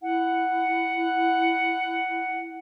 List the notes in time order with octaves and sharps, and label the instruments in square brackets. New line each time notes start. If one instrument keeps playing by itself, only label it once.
[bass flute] E4 [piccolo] F#5